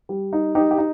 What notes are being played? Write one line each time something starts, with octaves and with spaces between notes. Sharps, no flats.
G3
D#4
D#4 G4
G4
D#4